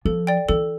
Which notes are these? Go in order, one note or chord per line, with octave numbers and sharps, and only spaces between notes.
F3 A4
D5 G5
E3 A4